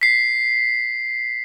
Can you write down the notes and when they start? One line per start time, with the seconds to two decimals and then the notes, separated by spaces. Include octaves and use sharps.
0.01 B6 C7